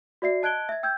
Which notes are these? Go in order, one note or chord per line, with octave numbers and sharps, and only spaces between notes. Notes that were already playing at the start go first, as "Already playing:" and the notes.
F#4 D5 E5 C7
D#5 A5 F#6 G#6 D7 G7
E5 G#6
G5 E6 G6 G#6